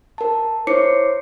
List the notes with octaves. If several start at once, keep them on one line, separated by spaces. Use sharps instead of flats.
A#4 A5
E4 C5 C#5 D6 C7 C#7